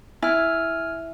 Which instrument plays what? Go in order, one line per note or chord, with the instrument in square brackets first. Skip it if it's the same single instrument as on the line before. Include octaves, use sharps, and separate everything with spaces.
[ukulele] E4 [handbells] G#5 F6